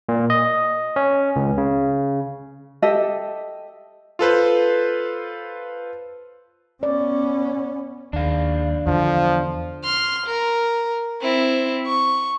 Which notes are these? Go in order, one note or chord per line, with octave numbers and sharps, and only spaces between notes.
A#2
D#5
C#4
C#2
C#3
G4 A4 D#5 E5
F4 A4 B4 C5
B3 C#4 D5
D#2 D4 F5
E2 D3 F3
C6 F6
A#4
C4 E4
C#6